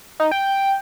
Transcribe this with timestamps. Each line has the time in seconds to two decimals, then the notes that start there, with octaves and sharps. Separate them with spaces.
0.20 D#4
0.31 G5